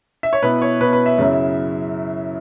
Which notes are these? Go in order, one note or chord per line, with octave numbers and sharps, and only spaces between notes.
E5
C#5
B2 B3 E4 B4
C#5
B2 B3 E4 B4
B4
E5
F#2 C#3 F#3 E4